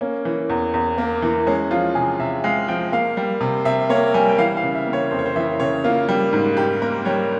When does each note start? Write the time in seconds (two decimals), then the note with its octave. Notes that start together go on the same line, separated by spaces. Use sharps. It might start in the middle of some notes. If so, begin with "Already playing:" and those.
0.01 A#3 C#4
0.25 E3
0.49 E2
0.74 E2
0.98 A#3
1.22 E3
1.46 G#3 C#4
1.71 F3 F4
1.95 C3 G#4
2.19 C3 E5
2.44 G#3 F5
2.68 F3 G5
2.92 A#3 F5
3.17 G3
3.41 C3
3.65 C3 E5
3.89 A#3 C#5
4.14 G3 G#5
4.29 G5
4.38 E3 F5
4.57 F5
4.63 C#3
4.75 E5
4.87 A#3
4.93 C#5
5.11 F2 C5
5.19 C#5
5.26 C5
5.36 E3 E5
5.60 C#3 C#5
5.84 A#3 F4
6.09 G3
6.33 G#2
6.57 G#2 G4
6.82 A#3 A#4
7.05 G3 C#5